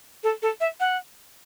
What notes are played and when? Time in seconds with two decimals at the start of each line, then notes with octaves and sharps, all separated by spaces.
0.24 A4
0.42 A4
0.61 E5
0.80 F#5